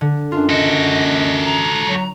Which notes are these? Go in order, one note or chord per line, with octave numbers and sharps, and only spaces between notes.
D3
F#2 D4 F4
F#4 A4 D#5
A#5
F#3